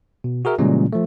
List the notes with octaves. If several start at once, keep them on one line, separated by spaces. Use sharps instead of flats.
B2
F#4 G#4 A#4 E5
A#2 C#3 E3 G3 G#3 C#4
F3 A3